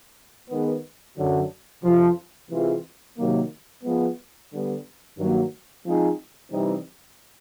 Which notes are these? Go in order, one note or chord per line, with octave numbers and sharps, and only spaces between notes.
D#3 G#3 B3
F#2 D3 F#3
F2 C3 F3
C3 E3 G#3 C4 F4
C3 D#3 F#3 A#3
F3 G#3 B3
D3 G3 B3
G2 D#3 F#3 A#3
F3 G#3 C4 D#4 G#4
C3 E3 G3 C4 D#4